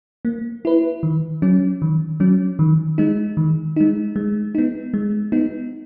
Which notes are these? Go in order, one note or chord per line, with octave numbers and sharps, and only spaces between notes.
A#3
E4 B4
D#3
F#3 C#4
D#3
F#3 C#4
D#3
G#3 D#4
D#3
G#3 D#4
G#3
B3 D#4
G#3
B3 D#4